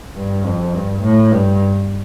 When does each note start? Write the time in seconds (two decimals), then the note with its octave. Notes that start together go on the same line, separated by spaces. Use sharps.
0.15 G2
0.44 F2
0.73 G2
1.02 A2
1.31 G2